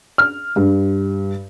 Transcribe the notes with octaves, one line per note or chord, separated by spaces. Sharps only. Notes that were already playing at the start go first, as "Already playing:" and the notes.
F6
G2